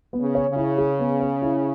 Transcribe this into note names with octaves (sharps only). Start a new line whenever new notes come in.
B3
C#3
C#5
C#3
E4
G#4
B3
C#5
E4